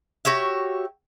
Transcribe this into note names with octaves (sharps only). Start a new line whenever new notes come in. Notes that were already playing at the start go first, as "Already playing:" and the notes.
F#4 G4 C#5 E5